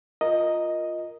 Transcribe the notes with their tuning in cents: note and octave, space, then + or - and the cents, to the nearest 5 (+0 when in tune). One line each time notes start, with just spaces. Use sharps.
F4 +0 A#4 +0 D#5 +0